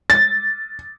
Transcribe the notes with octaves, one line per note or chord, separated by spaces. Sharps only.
A6